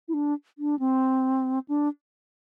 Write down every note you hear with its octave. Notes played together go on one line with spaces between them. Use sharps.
E4
D4
D4
C4
D4